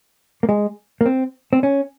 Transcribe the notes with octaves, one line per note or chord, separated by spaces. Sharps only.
A#3
G#3
A#3
C4
C4
C#4